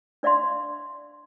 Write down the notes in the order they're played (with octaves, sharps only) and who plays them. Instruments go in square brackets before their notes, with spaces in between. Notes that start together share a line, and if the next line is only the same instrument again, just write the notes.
[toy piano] D4 D5 E5 F5 C6